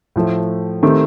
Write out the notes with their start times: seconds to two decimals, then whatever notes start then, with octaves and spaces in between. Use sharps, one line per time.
0.16 A2 F3 A3
0.83 D#3 A3 C4 G4